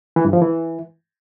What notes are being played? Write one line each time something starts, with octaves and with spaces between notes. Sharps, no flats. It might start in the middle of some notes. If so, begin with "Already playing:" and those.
E3
G2
F3
E3